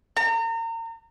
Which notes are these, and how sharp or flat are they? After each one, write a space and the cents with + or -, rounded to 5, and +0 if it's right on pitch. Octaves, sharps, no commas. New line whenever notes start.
A#5 -35